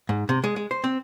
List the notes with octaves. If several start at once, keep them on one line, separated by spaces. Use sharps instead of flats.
G#2
C3
G#3
G#3
C5
C4